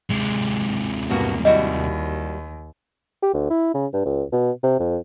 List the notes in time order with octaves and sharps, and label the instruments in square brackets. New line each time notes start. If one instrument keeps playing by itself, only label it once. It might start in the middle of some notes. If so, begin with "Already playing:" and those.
[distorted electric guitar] C3 G#3
[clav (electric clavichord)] G2 B2 F#4 [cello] A#3
[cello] D#2 [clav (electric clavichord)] G3 E4 F#4 [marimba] D#5
[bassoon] G4
D2
E4
C#3
G2
C#2
B2
C3
F2